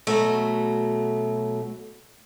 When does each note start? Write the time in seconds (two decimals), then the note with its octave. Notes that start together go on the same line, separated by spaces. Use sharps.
0.07 B2 F#3 A3